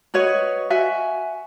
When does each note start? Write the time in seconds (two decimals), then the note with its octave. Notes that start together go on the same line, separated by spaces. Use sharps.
0.14 F#4 B4 C#5 D#5
0.70 F#4 E5 G#5